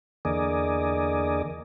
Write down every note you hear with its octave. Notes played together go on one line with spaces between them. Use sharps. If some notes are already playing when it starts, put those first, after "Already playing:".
E2 D3 A#3 G#4 D5 D#5